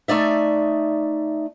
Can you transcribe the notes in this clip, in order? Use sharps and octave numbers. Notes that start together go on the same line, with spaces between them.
A3 D#4 D5 E5